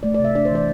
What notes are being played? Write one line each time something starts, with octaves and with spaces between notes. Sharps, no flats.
A3 D5
D5
C3
E5
D4 D5
C5
E3 D5